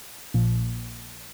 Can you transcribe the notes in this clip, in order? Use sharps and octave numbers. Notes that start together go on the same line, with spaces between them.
A#1 A#2 F3